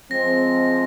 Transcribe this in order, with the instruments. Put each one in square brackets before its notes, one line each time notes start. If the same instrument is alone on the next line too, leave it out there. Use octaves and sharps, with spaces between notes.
[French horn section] F3 G#3 C4 [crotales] A#6